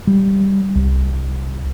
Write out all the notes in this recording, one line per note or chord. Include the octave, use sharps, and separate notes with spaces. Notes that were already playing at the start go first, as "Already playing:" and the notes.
G3
C2